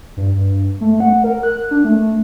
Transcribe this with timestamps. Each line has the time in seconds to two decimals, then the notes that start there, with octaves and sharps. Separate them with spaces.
0.17 G2
0.35 G2
0.81 A3
1.00 F#5
1.24 A#4
1.43 F#6
1.71 D4
1.84 A3